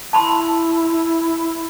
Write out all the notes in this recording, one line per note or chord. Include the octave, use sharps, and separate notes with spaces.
E4 A5 B5 C6